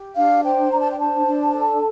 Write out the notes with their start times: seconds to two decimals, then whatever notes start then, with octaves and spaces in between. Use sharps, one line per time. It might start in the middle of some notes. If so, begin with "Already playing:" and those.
Already playing: G4
0.15 D4 F5
0.43 C5 G5
0.71 D4 A#5
0.80 A5
0.89 G5
0.99 C5 A5
1.26 D4
1.54 A4